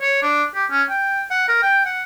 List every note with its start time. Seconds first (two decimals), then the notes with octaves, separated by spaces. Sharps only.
0.01 C#5
0.23 D4
0.55 G4
0.71 C#4
0.90 G5
1.31 F#5
1.48 A#4
1.63 G5
1.86 F#5